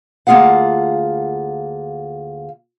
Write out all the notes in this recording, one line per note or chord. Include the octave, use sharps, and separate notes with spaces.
D2 A#3 F4 G#4 F5 F#5